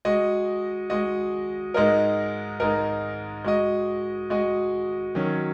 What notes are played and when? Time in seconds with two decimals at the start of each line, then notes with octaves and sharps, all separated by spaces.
0.05 G#3 F#4 D#5
0.90 G#3 F#4 D#5
1.74 G#2 G#3 D#4 A#4
2.60 G#2 G#3 D#4 A#4
3.44 G#3 F#4 D#5
4.30 G#3 F#4 D#5
5.15 D#3 F#3 C#4